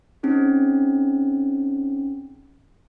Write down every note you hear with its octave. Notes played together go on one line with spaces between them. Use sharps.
C4 C#4 D#4 G#4